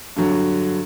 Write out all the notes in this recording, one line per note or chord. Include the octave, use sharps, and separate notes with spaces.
G2 D3 F#3